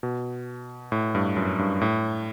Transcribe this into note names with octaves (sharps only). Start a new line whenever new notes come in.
B2
A2
G2
F#2
G2
A2